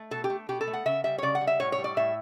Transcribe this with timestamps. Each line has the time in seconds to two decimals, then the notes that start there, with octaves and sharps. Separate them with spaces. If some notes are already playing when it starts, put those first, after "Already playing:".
Already playing: A3
0.11 B2 A4
0.24 G4
0.30 A3
0.49 B2 G4
0.61 A4
0.67 A3
0.73 F#5
0.85 C#3 E5
1.04 G3 E5
1.18 C#5
1.22 C#3 D5
1.35 F#5
1.41 G3
1.47 E5
1.60 A2 C#5
1.72 C#5
1.78 G3
1.84 D5
1.97 A2 E5